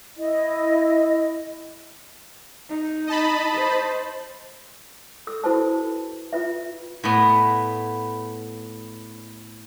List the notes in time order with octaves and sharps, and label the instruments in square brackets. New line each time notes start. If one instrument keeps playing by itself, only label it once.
[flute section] E4 D#5
[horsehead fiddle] D#4
[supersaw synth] D#5 A5 B5
[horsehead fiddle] C5
[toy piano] A4 E6
E4 F#4 A4 B4 C5 A5
F4 B4 E5
[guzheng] A2 B3